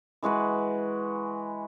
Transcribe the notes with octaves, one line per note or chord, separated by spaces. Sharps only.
E3 G#3 F#4 B4